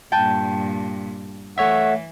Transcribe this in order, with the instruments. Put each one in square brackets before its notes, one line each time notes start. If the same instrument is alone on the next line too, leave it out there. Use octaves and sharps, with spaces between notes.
[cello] G2 A#2 [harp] G5 A5
[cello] E3 [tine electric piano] A3 C#5 E5 [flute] F#5